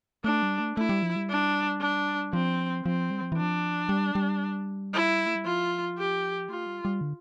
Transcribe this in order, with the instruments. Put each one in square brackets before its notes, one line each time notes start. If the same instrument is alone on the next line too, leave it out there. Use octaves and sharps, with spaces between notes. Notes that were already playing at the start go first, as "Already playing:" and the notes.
[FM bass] A3 [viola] D4
[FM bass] G3
A3
[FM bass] A3 [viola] E4
[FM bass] G3
F3
G3
[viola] D4
D4
[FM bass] F3 [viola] C4
[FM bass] F3 [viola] C4
[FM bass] G3
F3
E3
[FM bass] F3 [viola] D4
[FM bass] G3
G3
[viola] E4
[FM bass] A3
G3
[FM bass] F3 [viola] F4
[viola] G4
[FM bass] A3 [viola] F4
[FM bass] G3
G3
D3